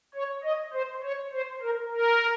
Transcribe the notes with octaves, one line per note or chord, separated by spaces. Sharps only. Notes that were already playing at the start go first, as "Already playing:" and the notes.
C#5
D#5
C5
C#5
C5
A#4
A#4